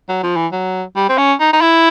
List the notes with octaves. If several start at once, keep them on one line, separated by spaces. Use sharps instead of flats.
F#3
F3
E3
F#3
G3
C4
C#4
D#4
D#4
E4